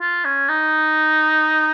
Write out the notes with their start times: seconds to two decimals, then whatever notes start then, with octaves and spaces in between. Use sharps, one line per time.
0.01 F4
0.25 C#4
0.49 D#4